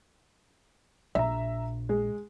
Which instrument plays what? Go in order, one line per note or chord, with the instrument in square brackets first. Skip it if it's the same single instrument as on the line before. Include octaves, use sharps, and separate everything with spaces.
[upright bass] A#1 [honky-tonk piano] E5 A#5
[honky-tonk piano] G#3